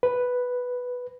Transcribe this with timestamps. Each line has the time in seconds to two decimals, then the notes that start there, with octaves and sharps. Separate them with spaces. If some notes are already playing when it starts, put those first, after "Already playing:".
0.03 B4